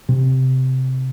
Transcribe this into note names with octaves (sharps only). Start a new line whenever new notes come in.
C3